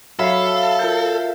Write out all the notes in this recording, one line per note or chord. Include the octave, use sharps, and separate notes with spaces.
F#3 A4 E5 F5 B5
F4 A#4 G6